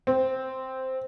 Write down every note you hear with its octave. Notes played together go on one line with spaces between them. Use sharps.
C4